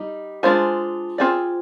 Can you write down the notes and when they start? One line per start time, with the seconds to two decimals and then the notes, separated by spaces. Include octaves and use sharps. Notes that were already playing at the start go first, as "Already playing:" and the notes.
Already playing: G3 D#4
0.43 G#3 D4 F4 G#4 C5
1.18 C4 F4 G#4 D5